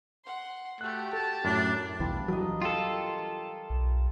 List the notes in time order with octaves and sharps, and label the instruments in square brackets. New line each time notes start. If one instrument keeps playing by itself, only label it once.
[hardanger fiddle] F#5 C6
[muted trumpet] A3 [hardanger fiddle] F#4 G4 [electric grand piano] F#6
[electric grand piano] A4 [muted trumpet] A5
[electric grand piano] F#2 A2 [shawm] D4
[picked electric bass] B1 E2 E3 [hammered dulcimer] G3 D4 F4
[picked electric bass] E3 F#3 [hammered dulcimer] A#4 D#5
[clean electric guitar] F4 A4 [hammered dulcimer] G4
[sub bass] B1